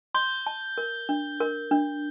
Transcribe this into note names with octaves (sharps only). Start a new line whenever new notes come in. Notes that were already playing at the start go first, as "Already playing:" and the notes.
C6 G6 G7
A5
A#4
D4
A#4
D4